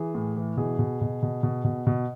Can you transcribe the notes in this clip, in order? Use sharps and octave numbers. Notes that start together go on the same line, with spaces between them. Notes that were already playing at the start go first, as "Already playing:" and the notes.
Already playing: E3 G#4
A2
E3
B2 G#4
B2
B2
B2
B2
B2
B2